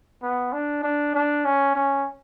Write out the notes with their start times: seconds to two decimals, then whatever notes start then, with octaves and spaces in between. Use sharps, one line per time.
0.23 B3
0.53 D4
0.83 D4
1.15 D4
1.45 C#4
1.75 C#4